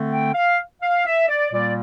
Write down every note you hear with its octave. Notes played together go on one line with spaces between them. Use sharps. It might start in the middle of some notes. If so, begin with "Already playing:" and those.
Already playing: D3 A3 C4
G5
F5
F5
E5
D5
A#2 G3 A#3 D5